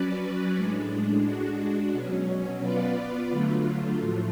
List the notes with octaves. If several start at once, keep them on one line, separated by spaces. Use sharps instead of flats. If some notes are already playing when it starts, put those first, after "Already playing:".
Already playing: F#3 C#4 F#4 B4 D5
A2 G#3 D4
G#3 D4 F#4
B2 F#3 C#4
B3 F4 B4 D5
D3 F#3 A3 F4
A2 F3 A3